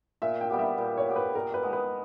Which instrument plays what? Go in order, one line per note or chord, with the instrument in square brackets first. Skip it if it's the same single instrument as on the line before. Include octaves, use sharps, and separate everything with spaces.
[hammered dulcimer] A#2 [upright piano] E5
[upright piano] G5
[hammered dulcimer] G3 B3 G4
[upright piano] E5
[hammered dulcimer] A#2
[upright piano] C#5
[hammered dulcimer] G3 B3 G4
[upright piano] B4
[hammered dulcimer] A#2 [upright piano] A#4
[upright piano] B4
[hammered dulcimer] G#3 B3 D#4
[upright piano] B4